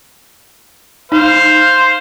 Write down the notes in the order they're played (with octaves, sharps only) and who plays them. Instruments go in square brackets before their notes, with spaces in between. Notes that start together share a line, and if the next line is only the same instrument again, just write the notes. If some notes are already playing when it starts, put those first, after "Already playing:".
[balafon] D#4 [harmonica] C5 F5